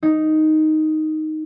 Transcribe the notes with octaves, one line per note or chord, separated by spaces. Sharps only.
D#4